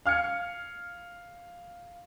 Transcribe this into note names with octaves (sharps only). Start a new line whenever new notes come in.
F5 F6 G#6 C#7